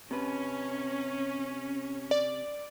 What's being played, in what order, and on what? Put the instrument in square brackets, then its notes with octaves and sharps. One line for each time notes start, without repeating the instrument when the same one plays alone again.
[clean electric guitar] C3 B4 [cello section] C#4
[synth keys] D5